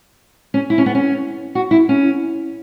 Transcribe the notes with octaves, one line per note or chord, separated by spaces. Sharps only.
C#4
E4
C#4
B3
C#4
F#4
E4
C#4